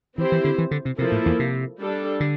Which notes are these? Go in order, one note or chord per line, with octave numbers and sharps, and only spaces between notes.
E3 C4 E4 G4 C5
E3
D3
E3
D3
C3
C3 F3 A#3 E4 A4
A2
E2
C3
G3 D4 A4
D3